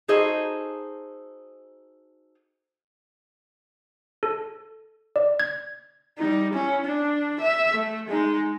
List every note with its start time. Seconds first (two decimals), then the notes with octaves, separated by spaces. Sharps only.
0.08 D#4 F#4 G#4 A4 C5 D#5
4.23 A4
5.16 D5
5.40 G#6
6.18 G3 D#4
6.53 C#4 E4
6.85 D4
7.41 E5
7.73 A3
8.09 G#3 D#4